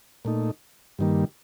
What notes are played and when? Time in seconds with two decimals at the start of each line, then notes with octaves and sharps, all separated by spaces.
0.25 A#2 A3 D#4
0.99 G2 D#3 G3 A#3